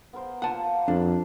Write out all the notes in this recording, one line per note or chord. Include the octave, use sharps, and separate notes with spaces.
B3 A#4 C5
A#3 F4 F#5 A5
F2 D4 A5